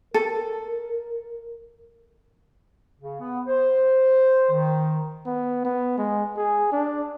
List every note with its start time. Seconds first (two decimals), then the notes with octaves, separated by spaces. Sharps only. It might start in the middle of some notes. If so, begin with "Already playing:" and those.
0.14 A4 A#4
3.00 C#3
3.20 B3
3.47 C5
4.51 D#3
5.26 B3
5.65 B3
5.98 G#3
6.37 G#4
6.72 D4